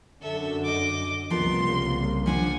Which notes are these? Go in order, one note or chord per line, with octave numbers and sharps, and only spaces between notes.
F#2 D3 A4 E5
D#5 D6
C2 C#3 F3 A#3 B3 A#4 C6
F3 D4 C5 F#5 G#5